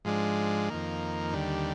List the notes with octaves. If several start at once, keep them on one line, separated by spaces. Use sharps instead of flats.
G#2 F3 G#3 D4
F2 D#3 A#3
D#2 D3 G3